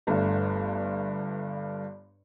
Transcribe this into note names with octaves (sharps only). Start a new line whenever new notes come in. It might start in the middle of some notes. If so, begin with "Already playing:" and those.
G1 G2 A3